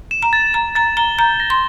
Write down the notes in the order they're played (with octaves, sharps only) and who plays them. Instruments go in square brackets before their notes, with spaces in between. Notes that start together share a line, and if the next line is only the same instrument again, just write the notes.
[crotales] E7
[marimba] A#5
[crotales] A6
[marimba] A#5 [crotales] E7
[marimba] A#5 [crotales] A6
[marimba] A#5 [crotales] G7
[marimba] A#5 [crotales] G6
[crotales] A#6
[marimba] C6